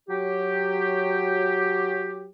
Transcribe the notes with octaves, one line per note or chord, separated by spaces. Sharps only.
F#3 G4